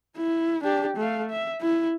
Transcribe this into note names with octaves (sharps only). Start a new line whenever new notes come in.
E4
D4 G4
A3 F5
E5
E4